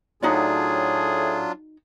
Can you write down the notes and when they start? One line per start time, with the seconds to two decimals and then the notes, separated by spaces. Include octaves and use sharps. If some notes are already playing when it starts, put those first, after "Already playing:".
0.22 A2 F#3 D4 D#4 F4 F#4 G#4 D5